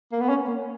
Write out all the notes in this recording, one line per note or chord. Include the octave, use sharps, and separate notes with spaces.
A#3
B3
C#4
A#3